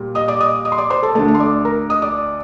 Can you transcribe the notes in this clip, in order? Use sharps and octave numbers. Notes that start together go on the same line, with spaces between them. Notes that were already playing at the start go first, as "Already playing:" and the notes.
Already playing: A#2 G3 A#3
D#5 D#6
D5 D6
D#5 D#6
D#5 D#6
C6
D5 D6
C5 C6
A4 A5
D2 D3 A3 A4 A5
A4 A5
C6
D5 D6
A#4 A#5
D#5 D#6
D5 D6